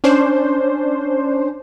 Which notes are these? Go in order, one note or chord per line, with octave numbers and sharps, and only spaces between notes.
C#4 D4 C5